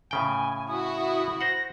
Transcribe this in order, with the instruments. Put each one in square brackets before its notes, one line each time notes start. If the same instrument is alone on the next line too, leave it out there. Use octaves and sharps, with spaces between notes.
[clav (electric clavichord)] A2 C#3 G5 [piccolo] G#5
[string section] E4 F#4 [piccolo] D#6
[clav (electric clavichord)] C5 F#5 [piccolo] A#6